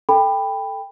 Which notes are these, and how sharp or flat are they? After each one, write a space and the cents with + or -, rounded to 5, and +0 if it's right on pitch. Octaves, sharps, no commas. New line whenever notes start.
A4 +0 G5 +20 B5 +5